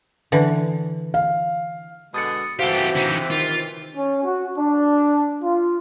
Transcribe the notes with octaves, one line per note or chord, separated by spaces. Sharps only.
D3 E3
F5
B2 D3 G#3 D#6 A6 C#7
C3 E3 F#4 G4 A4 C5 F5
D3 D#4 B6
D#3 F4
C#4
F#4
D4
F4